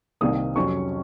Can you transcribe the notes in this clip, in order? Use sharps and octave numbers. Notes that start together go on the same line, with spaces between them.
C2 C3 D#3 A#3 D#6
F2 C3 F#3 C#4 C#6